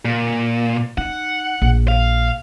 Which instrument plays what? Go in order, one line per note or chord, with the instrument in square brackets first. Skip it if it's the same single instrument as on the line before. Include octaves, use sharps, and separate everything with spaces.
[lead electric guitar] A#2
[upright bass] D#4 [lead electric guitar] F#5
[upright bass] A#1
[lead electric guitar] F5